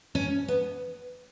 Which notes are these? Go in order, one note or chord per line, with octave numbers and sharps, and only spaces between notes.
C#4
B3